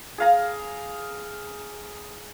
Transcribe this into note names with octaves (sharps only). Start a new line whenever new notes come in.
G#4 F5 A#5